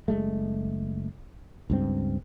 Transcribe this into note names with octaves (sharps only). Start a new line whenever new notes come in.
F#1 G#3 A3
C#2 G2 C4